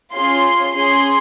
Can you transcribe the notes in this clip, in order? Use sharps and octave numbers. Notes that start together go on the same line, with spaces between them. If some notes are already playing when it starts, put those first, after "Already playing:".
C#4 F4 G#4 C6
C#4 G#4 C6